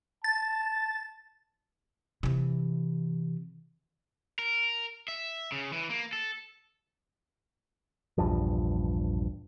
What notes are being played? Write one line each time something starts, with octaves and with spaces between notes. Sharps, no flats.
A5 A6
C3 E3
A#4
E5
C#3
E3
A#3
A4
A#1 E2 G2 F3